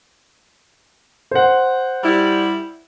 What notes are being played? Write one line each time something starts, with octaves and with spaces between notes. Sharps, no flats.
C5 F#5
G3 E4